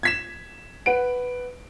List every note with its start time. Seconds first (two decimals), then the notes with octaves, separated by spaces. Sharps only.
0.03 G#6 B6 E7
0.86 B4 F#5 D7